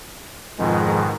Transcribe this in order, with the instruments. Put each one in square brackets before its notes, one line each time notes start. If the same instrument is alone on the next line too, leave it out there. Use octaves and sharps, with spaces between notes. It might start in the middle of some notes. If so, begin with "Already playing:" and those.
[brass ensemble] F2 G#3 [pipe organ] G#2 B2 D#3